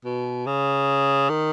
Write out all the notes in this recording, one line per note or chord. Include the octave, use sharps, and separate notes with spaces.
B2
C#3
D#3